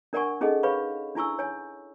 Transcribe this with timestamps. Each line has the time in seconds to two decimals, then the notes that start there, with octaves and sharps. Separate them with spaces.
0.13 D4 A#4 D5 F#5 G#5 C#6
0.41 C#4 D#4 G#4 A4 D#5 F#5
0.63 G#4 B4 C#5 F5 B5 C#6
1.15 D4 E4 G#5 C#6 E6
1.39 C#5 G#5